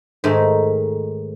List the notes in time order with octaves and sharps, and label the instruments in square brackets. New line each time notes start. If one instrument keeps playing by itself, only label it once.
[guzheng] G#2 D#3 A3